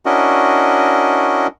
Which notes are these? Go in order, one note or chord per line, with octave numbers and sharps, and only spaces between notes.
C#4 D4 E4 F#4 A#4 D#5